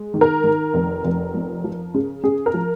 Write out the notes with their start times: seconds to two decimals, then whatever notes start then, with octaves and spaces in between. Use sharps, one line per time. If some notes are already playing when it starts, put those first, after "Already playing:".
Already playing: G#3
0.14 D#3
0.21 A#4
0.44 D#3
0.74 F1
1.04 F1
1.34 F2
1.64 F3
1.94 C#3
2.23 C#3 G#4
2.46 A#4
2.54 F3